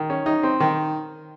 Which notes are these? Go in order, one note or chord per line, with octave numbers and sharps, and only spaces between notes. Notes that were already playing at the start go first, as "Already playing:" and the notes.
Already playing: D#3
C#4
D#4
C4
D#3